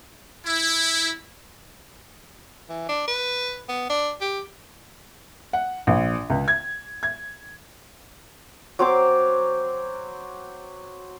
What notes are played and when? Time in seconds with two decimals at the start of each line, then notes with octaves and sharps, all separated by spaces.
0.46 E4
2.69 E3
2.89 D4
3.08 B4
3.69 B3
3.90 D4
4.21 G4
5.53 F#5
5.87 A#1
6.30 C#2
6.48 G#6
7.03 G#6
8.79 F#3 C4 C6 D6